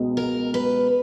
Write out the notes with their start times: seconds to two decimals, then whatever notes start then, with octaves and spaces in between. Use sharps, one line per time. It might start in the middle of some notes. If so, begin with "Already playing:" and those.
Already playing: C#2 B2 G#3 B3
0.17 A#4
0.54 B4